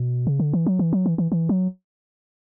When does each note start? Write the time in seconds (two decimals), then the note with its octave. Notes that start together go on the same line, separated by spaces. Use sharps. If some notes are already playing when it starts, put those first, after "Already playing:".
Already playing: B2
0.27 C#3
0.40 D3
0.53 E3
0.66 F#3
0.79 E3
0.93 F#3
1.06 E3
1.18 E3
1.32 E3
1.49 F#3